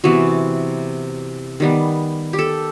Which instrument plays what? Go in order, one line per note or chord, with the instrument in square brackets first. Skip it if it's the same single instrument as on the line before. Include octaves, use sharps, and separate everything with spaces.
[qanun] C3 E3 B3 F#4
D#3 G3 B3
G4
A4